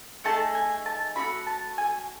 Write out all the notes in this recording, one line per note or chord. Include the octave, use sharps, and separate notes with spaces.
A3 D#4 G#4 A5
G#5
A5
A3 D#4 F#4 B5
A5
G#5